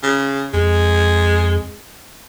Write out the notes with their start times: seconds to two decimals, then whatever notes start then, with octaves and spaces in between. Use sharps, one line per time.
0.03 C#3
0.54 F2 G#3